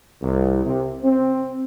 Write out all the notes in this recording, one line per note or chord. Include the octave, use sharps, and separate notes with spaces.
C2
C3
C4